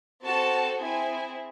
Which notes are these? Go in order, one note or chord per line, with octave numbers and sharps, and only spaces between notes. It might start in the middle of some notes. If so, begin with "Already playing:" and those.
C4 F#4 A4 A5
C4 E4 G#4 G#5